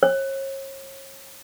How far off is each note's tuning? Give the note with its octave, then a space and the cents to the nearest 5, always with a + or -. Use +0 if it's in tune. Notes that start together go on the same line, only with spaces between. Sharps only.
C#5 -35